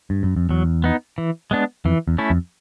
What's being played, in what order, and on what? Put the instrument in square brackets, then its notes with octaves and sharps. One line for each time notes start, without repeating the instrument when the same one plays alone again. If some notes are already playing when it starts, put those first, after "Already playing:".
[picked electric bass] G2
F#2
F2
[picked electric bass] E2 [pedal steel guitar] F#3
[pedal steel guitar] B3 D#4
E3
G#3 B3 D4
[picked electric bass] F2 [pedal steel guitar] E3
[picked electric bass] E2
[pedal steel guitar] A3 C#4 E4
[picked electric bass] F2